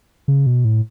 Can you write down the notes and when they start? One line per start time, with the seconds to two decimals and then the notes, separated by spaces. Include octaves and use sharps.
0.28 C#3
0.46 B2
0.65 A2